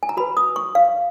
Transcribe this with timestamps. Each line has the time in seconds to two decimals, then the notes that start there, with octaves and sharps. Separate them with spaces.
0.03 G#5
0.09 A#5
0.17 F#4 B4 B5
0.37 D#6
0.56 C#6
0.75 F5